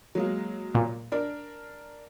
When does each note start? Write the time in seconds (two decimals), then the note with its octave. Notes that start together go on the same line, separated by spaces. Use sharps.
0.15 F#3 G#3 A#3
0.75 A#2
1.12 D4 A#4 D5